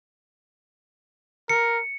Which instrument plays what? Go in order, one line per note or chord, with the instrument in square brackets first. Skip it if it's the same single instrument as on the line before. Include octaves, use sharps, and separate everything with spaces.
[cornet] A#4 [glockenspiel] C#7